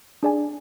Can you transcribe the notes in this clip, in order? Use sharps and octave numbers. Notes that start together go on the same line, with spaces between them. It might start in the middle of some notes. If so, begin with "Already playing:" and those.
D4 G#4 D5 G#5